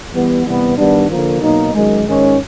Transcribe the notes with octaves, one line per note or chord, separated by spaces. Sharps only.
E3 G3 B3
C3 E3 G3 B3
G2 D#3 G3 B3 D4
D3 F3 A#3
B2 F#3 A#3 D#4
F#2 D#3 G#3
G#2 D#3 G#3 C#4